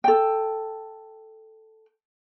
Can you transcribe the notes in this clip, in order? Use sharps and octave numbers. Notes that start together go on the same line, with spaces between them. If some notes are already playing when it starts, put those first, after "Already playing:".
A4 G5